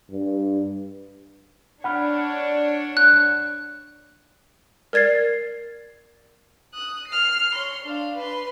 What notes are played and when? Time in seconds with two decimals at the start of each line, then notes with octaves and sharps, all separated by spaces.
0.10 G2
1.84 D4 C#5 F#5 B5 F6
2.97 F#6
4.93 A#4 D5 G#6 A6 C7
6.74 D#6 F#6
7.08 F6 C7
7.55 C#5 C6
7.84 D4 F5
8.17 B4 C6